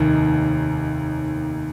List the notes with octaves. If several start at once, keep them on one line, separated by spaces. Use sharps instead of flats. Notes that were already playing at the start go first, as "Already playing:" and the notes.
Already playing: F1 D#2 D#3